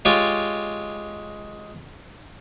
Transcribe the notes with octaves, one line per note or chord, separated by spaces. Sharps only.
G#3 F4 G4 C#5